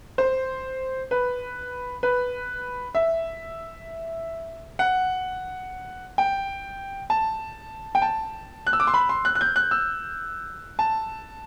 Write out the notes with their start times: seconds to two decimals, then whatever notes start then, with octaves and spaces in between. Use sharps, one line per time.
0.18 C5
1.11 B4
2.03 B4
2.95 E5
4.79 F#5
6.18 G5
7.10 A5
7.95 G5
8.02 A5
8.67 F#6
8.73 E6
8.80 D6
8.87 C6
8.94 B5
9.09 C6
9.25 F#6
9.35 F#6
9.41 G6
9.56 F#6
9.71 E6
10.79 A5